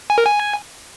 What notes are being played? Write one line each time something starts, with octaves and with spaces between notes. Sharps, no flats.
G#5
A#4
G#5